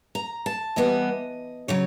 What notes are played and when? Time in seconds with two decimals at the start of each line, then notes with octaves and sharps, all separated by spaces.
0.15 A#5
0.46 A5
0.76 E3 G3 B3 D#5
1.68 C#3 F#3 C#5